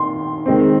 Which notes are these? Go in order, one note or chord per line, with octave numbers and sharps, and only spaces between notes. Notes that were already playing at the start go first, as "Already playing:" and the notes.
Already playing: D#3 C6
D#3 G#3 C4